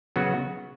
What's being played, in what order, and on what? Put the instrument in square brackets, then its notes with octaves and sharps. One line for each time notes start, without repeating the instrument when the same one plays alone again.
[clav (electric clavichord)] C#3 F#3 B3 F#4